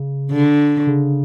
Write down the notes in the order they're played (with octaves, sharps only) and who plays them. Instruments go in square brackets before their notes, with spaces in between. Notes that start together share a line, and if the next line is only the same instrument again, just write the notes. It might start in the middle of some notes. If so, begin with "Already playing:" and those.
Already playing: [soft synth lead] C#3
[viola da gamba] D3
[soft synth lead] C#3